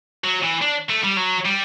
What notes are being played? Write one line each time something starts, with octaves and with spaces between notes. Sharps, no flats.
F#3
E3
D4
A3
G3
F#3
G3